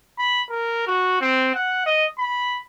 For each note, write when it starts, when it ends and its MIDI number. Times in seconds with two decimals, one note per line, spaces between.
0.19 0.43 83
0.50 0.86 70
0.87 1.21 66
1.21 1.51 60
1.55 1.85 78
1.86 2.05 75
2.19 2.60 83